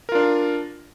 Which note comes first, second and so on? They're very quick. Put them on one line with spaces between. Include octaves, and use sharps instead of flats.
A#4 F4 D4